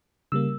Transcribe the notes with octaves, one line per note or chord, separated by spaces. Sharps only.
C#3 G3 A#3 E6